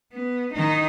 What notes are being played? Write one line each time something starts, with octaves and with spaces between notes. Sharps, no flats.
B3
D#3 D#4